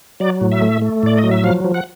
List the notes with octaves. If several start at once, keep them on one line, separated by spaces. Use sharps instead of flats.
F#3 D5
A2
E5
A3
A3
A2 D5
D#5
F#3
E5
F3 F5
F3
F#5